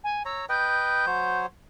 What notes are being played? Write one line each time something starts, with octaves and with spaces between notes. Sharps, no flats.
G#5
C#5 A#5 E6
B4 D#5 G5 G6
F#3 C5 C#5